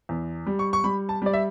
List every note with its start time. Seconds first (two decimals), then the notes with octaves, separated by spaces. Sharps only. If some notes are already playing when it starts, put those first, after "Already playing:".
0.09 E2
0.46 G3
0.59 C#6
0.73 C#6
0.84 G3 B5
1.09 A5
1.22 G3 D5
1.33 E5